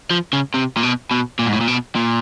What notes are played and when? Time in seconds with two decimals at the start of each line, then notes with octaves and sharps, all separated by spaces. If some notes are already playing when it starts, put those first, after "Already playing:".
0.11 F3
0.33 C#3
0.54 C3
0.77 A#2
0.83 B2
1.11 B2
1.39 A#2
1.46 G#2
1.53 A2
1.61 A#2
1.68 B2
1.95 A#2